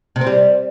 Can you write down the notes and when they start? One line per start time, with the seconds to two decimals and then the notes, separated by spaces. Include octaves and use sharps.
0.16 C3
0.21 C4
0.27 G3